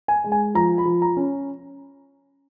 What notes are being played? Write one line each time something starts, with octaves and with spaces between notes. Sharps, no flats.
G#5
G#3
G#5
F3 A#5
B5
F3
A#5
C#4